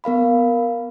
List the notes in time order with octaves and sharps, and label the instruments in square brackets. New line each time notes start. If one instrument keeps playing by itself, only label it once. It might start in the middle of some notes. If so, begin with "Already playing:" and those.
[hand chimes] B3 A#4 F5 B5